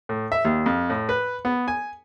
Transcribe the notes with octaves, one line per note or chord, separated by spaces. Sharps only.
A2
E5
D#2
F2
A2
B4
B3
G#5